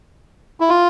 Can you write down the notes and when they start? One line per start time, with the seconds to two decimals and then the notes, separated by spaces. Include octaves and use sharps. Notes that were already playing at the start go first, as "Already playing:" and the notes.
0.60 E4
0.69 F4